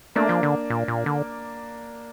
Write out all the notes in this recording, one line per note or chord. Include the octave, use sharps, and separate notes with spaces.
A3 A#3 D4
F3
D3
A#2
A#2
D3